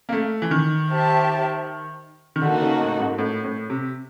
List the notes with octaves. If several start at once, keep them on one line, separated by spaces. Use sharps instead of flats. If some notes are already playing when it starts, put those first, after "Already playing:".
A#3
A3
E3
D#3
G4 C5 E5 A5
D#3
D3 A#3 D#4 F#4 A4
C#3
A2
G#2
A2
A2
C3